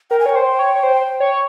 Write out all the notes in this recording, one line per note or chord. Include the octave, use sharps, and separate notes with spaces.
A#4 G5
G#5
C#5 G5
C5
C#5
C#5
C5
C#5